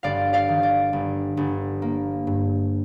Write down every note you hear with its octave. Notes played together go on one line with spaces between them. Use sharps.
G1 D5 F5
D5 F5
D#3
D5
G1
G1
A#3
G2